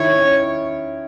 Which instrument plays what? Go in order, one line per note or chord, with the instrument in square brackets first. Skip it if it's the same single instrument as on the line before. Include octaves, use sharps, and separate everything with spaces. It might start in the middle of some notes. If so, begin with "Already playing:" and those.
Already playing: [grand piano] D#3 E4 [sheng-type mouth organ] C#5
[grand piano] C#4